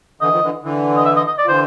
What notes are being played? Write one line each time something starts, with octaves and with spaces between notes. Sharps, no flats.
D3 E3 D#5
D#3 F3
D3 E3
D3 E3
D#5
E5
D#5
D#5
D5
F3
D3 E3 C5